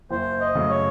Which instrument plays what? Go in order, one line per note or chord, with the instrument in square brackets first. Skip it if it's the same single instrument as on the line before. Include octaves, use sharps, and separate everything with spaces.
[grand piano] F#1 [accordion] C5
[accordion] D#5
[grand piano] F#2 C#3 A3
[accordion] C#5